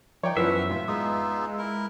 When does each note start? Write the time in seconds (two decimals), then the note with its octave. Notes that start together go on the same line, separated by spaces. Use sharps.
0.23 F3 D#4 C#5 D5 G5
0.37 F#2 E3 F3 B3 C#4 E5 F#5
0.70 A2 F4
0.88 G#3 B3 D#4 F4 D#6
1.58 E4 A#4